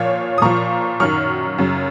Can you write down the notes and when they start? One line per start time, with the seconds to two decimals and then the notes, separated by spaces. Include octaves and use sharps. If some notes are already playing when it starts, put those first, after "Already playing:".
Already playing: A#2 F3 C#5 F5
0.38 D#6
0.42 A#2 F3 A#5 C#6
1.00 F#2 D#3 F#3 C#6 F6
1.58 F#2 C#3 F#3